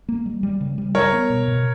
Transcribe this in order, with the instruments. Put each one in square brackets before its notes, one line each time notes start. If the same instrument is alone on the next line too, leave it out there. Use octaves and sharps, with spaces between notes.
[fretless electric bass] A#3
G3
G3
C#3
G3
[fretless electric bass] G3 [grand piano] A#4 C#5
[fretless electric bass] B3
B2
B2